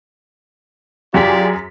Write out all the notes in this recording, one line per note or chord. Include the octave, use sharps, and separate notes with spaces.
F#2 F4 G4 G#4 D5 B6